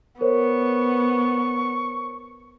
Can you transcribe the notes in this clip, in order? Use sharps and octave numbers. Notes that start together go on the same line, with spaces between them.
B3 A#4 C5 C#5 C#6